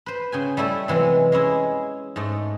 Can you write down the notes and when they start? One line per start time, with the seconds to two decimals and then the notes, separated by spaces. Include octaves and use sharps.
0.06 B4 C5
0.32 C#3 G5 G#5
0.57 G3 A3 E4 A4
0.88 C3 E3 F#3 G#3
1.32 G#3 C#4 E4 G#4
2.16 G#2 A3 D#4